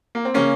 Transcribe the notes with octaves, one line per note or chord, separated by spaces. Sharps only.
A#3
C4
C#3 A#3 C#4